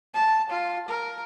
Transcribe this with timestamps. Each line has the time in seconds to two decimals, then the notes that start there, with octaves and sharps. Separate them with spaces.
0.14 A5
0.50 F4
0.89 A#4